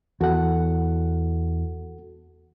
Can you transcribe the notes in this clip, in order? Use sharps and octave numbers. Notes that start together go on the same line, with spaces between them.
E2 F#4 A4 F#5